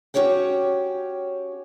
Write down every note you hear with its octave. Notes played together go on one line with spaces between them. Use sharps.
C#4 F#4 G4 C#5 G5